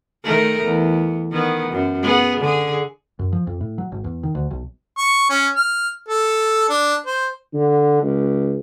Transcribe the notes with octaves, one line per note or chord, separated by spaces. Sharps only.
D#3 A3 A#4
E2
D#3 B3
F#2
B3 G#4
D3 G#4
F#2
F3
F2
A2
F#3
G#1
E2
D#3
D2
B1
C#6
C#4
F6
A4
D4
C5
D3
C#2